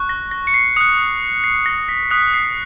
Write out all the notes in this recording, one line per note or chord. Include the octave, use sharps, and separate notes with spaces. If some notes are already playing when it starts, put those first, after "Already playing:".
Already playing: C#6 F#6
A#6
A#6
C#7
C7
D#6 F#6 C#7
C7
A#6
B6
D#6 F#6 B6
C7